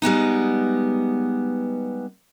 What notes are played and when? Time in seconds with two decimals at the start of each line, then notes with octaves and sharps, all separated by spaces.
0.02 G3 G#3 B3 D#4